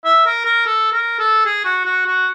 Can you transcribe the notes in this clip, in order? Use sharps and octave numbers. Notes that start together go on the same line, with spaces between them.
E5
A#4
A#4
A4
A#4
A4
G#4
F#4
F#4
F#4